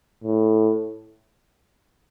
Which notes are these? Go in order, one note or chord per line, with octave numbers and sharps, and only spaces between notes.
A2